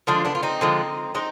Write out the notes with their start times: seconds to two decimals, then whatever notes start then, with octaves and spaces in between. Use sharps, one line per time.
0.07 D3 F3 G#3 D4 F4
0.25 B3 D4
0.35 F4
0.43 C4 D#4
0.61 D3 F3 G#3
1.15 G#3 C4 D#4